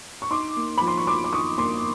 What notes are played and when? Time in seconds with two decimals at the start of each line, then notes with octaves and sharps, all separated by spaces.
0.22 C#6
0.31 D#4 C6 D6
0.56 A#3
0.78 F3 B5
0.88 C6
0.97 C#6
1.07 F3 C6 D6
1.24 D6
1.32 D#4 C#6 D#6
1.58 A#3 C6 D6